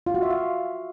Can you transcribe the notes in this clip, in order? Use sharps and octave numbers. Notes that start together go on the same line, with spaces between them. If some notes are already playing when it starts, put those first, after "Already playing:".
F4
F#4
E5
F5